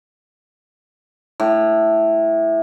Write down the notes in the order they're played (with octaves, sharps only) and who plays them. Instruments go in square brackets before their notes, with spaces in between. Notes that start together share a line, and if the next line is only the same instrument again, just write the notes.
[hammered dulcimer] A2